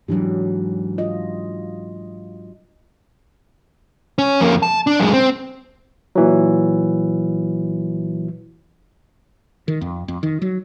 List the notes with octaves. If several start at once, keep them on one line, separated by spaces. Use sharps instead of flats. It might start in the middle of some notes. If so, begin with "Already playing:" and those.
G#2 E3 F#3 D4 G4
F4 D#5
C#4
F2 A#3
A5
D4
F#2 G#3
C4
A#2 E3 F#3
D#3
F2
F2
D#3
F#3